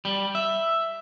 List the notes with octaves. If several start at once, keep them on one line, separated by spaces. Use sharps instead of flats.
G3
E5